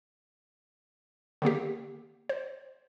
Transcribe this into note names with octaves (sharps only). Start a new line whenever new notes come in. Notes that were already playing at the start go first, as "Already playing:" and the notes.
D3 D#3 A#3 G4
C5